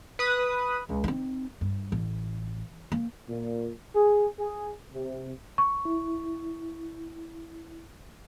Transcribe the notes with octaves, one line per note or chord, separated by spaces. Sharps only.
B4 D#6
C#2
C4 D#4
G2
A1
A#3
A#2
G#4
G#4
C3
C#6
E4